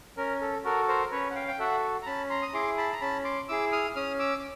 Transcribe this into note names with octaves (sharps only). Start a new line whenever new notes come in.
C#4 A#4
A4
F#4 A4 A#4
A#4 C5
C#4 B4 C#5
F#5
F5 G5
G5
F#4 A4 E5 F#5
A#5
C#4 A5 B5
A#5 C6
D#6
E4 G#4 C6 D6
A5 B5
A#5
C#4 A5 B5
C6 D6
E4 G#4 D6 E6
D#6 F6
C#4 D#6 F6
D6 E6
D6